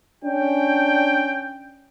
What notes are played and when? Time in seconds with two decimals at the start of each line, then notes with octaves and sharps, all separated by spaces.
0.24 C#4 D4 G5